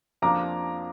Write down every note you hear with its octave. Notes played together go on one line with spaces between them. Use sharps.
F2 F3 A#3 D4 A#5 D6